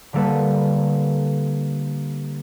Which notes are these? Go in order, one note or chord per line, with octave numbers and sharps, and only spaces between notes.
D3 G3 A#3 A4 B4